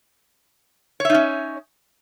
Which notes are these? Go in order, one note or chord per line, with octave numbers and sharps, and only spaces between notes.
C#4 D#4 C#5 E5